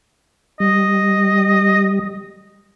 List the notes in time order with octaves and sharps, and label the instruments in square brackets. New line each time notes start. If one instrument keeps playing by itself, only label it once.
[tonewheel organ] G3 [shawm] D#5